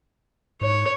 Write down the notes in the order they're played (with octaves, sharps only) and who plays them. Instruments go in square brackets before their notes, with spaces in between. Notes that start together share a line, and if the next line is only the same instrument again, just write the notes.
[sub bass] G#2 [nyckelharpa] C#5